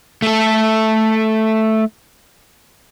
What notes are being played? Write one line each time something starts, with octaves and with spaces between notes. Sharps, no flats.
A3 A4